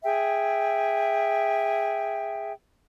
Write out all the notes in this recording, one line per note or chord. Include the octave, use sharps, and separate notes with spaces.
G#4 E5 G5